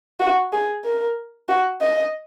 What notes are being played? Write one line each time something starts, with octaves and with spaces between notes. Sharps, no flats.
F#4
G#4
A#4
F#4
D#5